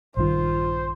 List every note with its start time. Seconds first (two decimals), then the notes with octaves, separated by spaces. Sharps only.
0.17 A#1 G2 D#3 F4 C5